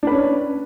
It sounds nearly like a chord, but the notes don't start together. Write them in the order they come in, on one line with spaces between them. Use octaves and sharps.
D4 B4 C#4